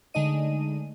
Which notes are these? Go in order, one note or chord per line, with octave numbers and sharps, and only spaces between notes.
D3 G#3 A3 D#4 D#5 D#7